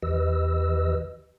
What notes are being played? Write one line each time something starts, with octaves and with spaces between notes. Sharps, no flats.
E2 E3 G4 B4 D#5 E6